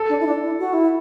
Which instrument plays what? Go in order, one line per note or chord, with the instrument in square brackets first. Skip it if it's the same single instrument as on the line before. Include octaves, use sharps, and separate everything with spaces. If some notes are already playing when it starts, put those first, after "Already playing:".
Already playing: [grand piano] A4
[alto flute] D4
E4
D4
E4
F#4
E4